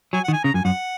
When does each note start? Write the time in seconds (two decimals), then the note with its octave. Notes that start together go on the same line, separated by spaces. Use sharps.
0.13 F#3 G#5
0.24 D#3 F#5
0.33 G#5
0.44 C#3 A#5
0.54 F#2 G#5
0.65 F#2 F#5